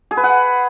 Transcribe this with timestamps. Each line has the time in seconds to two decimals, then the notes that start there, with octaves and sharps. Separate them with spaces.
0.11 G#4
0.17 B4
0.24 F#5